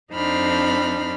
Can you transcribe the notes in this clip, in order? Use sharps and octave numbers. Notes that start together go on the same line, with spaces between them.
F2 C4 D4 D#4 B5 F6